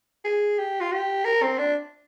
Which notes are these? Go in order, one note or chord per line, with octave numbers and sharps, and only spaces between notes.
G#4
G4
F4
G4
A#4
C4
D4